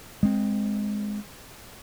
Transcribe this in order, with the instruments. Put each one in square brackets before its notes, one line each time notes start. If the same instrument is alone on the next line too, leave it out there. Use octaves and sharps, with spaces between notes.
[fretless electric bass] G#3 C4